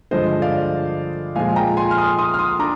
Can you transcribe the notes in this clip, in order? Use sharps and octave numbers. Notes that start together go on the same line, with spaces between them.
G2 D3 F3 G#3 D4 C5 D#5
D#5
D5 F5
A#2 F3 G#3 F5 G#5
G5 A#5
G#5 C6
F6
C6 D#6
C6 D#6
F6
C6 D#6
D4 A#5 D6